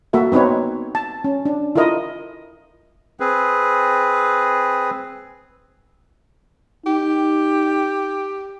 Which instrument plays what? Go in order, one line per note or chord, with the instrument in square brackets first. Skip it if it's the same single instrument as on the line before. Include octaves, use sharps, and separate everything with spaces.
[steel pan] A#3 F#4 A4 E5
B3 C4 D#4 B4 C#5
A5
C#4
D4
E4 F4 A4 A#4 D#5
[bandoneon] C4 G#4 B4
[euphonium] D#4 [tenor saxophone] G4